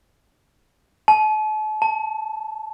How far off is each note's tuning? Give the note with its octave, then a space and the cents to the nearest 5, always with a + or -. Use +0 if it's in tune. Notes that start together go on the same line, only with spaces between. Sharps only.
A5 -40
A5 +15